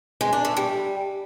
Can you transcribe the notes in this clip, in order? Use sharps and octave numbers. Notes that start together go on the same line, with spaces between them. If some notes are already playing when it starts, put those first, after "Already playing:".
G#3
D4
A3
G3